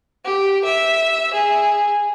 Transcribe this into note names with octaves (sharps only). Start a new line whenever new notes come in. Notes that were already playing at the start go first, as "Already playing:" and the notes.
G4
E5
G#4